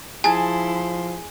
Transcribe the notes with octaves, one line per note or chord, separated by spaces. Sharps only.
F3 E4 G#4 G#5 A5 C6